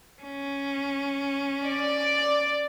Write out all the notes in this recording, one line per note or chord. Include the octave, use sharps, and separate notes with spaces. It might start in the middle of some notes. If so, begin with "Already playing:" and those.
C#4
D5